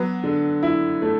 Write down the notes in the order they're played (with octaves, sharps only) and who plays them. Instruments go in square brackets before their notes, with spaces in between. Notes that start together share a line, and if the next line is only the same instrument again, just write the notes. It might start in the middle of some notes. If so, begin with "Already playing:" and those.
Already playing: [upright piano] F#3 [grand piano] B3 B4
[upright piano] D3
E4
A3